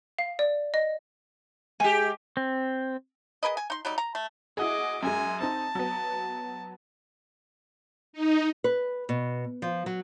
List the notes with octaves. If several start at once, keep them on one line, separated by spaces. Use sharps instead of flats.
F5
D5
D#5
G#3 G4 G#5
C4
G#4 A#4 B4 D#5
G#5
D#4 C6
F#3 G3 D#4
A#5
A3
E4 F#4 G#4 D#5 D6
F#2 G#3 G#5
C4 D#4 A5
F#3 B3
D#4
B4
B2
F3
F#3